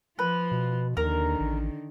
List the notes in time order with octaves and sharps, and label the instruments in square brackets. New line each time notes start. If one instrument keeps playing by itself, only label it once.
[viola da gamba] F3 F4 [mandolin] B4
[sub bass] B2
[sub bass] D#2 [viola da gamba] D3 D#3 [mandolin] A#4
[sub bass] A1